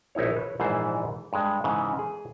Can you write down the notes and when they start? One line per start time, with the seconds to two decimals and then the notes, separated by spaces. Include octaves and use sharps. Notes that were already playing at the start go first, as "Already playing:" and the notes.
0.15 A#1 D#4 E4 C#5
0.37 B4 C#5
0.60 A#1 G#2 E3 C5 A5
1.33 G2 G#3
1.64 G#2 C#3 E3
1.99 G#4